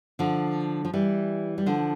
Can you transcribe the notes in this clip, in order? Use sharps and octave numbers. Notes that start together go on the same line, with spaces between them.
D3 F3
F3
E3 G3
G3
D3 F3